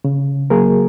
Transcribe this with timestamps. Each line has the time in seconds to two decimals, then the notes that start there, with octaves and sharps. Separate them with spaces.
0.04 C#3
0.50 F#3 A#3 G#4 A#4